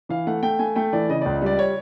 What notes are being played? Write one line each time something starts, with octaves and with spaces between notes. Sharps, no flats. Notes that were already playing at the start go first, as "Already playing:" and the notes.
E3 F5
A3 F#5
A3 G5
A3 G#5
A3 G5
E3 D5
C#3 D#5
C#2 D5
G3 D5
C#5